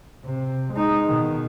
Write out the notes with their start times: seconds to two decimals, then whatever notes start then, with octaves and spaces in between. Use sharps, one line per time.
0.24 C3
0.73 G#3 D#4
1.07 B2 D#3